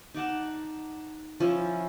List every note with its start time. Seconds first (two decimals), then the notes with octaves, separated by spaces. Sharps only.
0.14 D#4 D5 F#5 A5
1.40 F3 C#4 E4 C#5